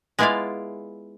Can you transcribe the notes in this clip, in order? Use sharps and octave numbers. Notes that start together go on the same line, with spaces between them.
G#3 B3 E4 F4 D5 F5